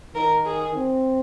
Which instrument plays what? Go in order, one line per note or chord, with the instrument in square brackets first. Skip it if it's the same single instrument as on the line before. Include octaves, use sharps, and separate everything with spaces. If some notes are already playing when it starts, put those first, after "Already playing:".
[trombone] D#3 [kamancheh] A#4
[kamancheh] G#4
[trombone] C4